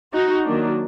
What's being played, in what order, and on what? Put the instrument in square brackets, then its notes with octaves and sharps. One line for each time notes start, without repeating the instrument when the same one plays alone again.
[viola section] D#4 F#4
D#3 F#3 A#3 D4